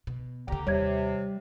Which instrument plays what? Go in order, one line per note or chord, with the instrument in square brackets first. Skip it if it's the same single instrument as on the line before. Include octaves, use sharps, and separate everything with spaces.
[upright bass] B2
[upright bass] D2 D3 [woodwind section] G4 A#5
[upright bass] D#2 [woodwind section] C3 [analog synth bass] G3 [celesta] C#5 G#6